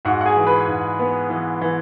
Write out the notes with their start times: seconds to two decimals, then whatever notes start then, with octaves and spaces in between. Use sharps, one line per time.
0.05 G#2 F#4 F#5
0.21 F#5
0.26 G#4 G#5
0.37 E3
0.46 B4 B5
0.68 G#2
0.99 B3
1.30 E3
1.61 E3